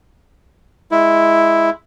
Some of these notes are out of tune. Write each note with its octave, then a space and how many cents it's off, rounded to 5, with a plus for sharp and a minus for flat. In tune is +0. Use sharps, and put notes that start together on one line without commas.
G#3 +5 E4 +0